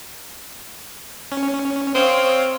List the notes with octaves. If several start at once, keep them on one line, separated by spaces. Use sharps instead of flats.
C#4
C4 C#5 F5 D#6